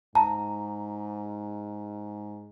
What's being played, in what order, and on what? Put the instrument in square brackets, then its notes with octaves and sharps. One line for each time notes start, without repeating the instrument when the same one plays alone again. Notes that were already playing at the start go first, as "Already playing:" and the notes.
[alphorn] G#2 [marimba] A5 [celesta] A#5